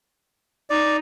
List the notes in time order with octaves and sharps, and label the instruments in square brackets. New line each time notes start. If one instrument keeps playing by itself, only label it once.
[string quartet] D#4 [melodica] D5